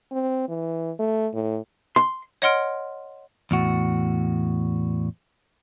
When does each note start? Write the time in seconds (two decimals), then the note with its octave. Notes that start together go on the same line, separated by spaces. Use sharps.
0.11 C4
0.48 E3
0.99 A3
1.34 A2
1.96 C6
2.42 C#5 D#5 F#5 C6 F6 D7
3.51 E2 A2 F#4